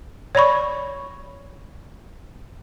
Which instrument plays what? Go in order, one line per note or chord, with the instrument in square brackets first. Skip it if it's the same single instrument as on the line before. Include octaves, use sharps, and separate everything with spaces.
[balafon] C#5 D5 B5 C#6